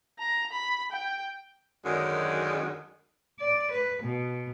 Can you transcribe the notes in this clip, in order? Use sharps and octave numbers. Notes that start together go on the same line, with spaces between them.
A#5
B5
G5
F#2 D3 D#3 F#3 G#3
D5
B4
B2